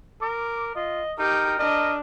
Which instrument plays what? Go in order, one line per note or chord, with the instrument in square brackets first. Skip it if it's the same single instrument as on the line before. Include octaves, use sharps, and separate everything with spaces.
[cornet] A#4 [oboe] D6
[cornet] F4 [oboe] D#5
[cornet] D#4 [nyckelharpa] G4 G5 [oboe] A#4
[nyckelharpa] D4 [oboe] A#4 [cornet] D#5